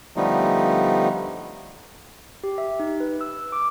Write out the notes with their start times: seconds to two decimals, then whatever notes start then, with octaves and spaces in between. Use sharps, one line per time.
0.16 D3 F3 G3 A3 B3 D#4
2.44 G4
2.58 E5
2.80 D#4
3.00 B4
3.21 E6
3.52 D6